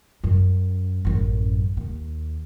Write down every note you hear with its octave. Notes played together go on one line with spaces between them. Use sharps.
F#2
A1 F#2
D#2